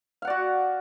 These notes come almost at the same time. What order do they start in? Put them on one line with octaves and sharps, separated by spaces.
F5 F#5 D5 F#4